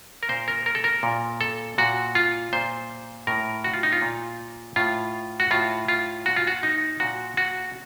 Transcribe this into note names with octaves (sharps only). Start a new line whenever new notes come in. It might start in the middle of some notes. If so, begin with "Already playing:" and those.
A#4
A#2 C5
A#4
A#4
A4
A#4
A#2
A4
A#2 F#4
F4
A#2 C5
A2 A#4
F#4
F4
D#4
F4
A#2
A2 F4
F#4
A2 F4
F4
A#2 F#4
F4
F#4
D#4
A#2 F#4
F#4